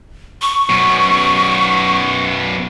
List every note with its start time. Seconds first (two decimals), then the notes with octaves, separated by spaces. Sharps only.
0.42 C#6
0.69 F#2 B2